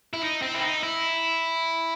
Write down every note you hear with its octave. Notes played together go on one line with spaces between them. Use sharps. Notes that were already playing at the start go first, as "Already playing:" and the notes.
E4
D#4
C4
E4
D#4
E4